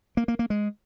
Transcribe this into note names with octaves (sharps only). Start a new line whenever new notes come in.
A#3
A#3
A#3
G#3